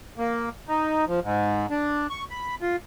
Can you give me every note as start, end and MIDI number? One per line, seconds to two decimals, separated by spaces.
0.18 0.49 58
0.69 1.05 63
1.08 1.20 53
1.24 1.66 44
1.70 2.07 62
2.10 2.24 85
2.31 2.55 83
2.62 2.76 65